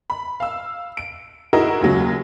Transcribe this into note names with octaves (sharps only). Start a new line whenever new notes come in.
B5
F5 E6
D7
D#4 E4 F#4 G#4 A#4 D#5
D#2 C#3 F#3